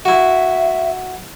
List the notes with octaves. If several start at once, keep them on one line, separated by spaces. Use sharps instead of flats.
E4 F#4 E5